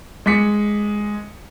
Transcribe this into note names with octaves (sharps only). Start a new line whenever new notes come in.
G#3 D6 B6 C#7